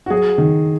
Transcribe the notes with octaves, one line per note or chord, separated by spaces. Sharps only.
F#4
F#3 G#4
D#3